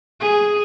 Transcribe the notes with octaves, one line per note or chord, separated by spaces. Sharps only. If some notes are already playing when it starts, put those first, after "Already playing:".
G#4